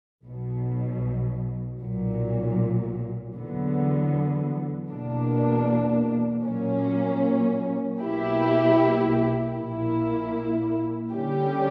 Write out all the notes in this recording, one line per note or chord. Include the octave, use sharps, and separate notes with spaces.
B1 B2 F#3
B1 A#2 F#3
E2 D3 F#3 B3
E2 B2 A#3 D4
A#2 F#3 A#3 C#4
B1 B2 A#3 E4 G4
A#1 A#2 A#3 E4
D3 G3 C#4 G4